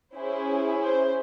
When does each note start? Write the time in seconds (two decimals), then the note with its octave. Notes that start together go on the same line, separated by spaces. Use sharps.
0.15 C#4 E4 G#4 C5
0.80 C5